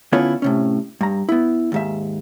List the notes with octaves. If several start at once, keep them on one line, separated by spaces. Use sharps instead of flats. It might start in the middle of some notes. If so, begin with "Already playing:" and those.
D3 B3 C#4 E4 F4 C#5
A2 C3 C#4
G2 A#5
B3 E4
D#2 G#2 E5